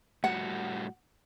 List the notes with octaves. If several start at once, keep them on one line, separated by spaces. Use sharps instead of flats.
A2 G3 F#4 F#5